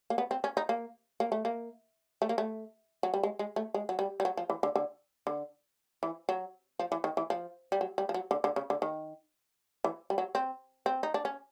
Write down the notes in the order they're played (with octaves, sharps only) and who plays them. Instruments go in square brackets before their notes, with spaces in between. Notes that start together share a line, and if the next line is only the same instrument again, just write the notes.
[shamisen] A#3
B3
C4
C#4
D#4
A#3
A#3
A3
A#3
A3
A#3
A3
F#3
G3
G#3
G#3
A3
G#3
F#3
G3
G3
F#3
F3
E3
D3
D3
D3
E3
F#3
F3
E3
D#3
E3
F3
G3
F#3
G3
F3
F#3
D3
D3
C#3
D3
D#3
E3
G3
F#3
C4
C4
D#4
D4
C#4